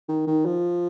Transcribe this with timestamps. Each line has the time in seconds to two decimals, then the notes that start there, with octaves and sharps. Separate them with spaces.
0.09 D#3
0.27 D#3
0.45 F3